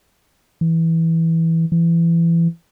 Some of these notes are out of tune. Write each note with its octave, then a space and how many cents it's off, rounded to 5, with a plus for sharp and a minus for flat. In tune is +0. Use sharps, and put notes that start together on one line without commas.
E3 -10
E3 +25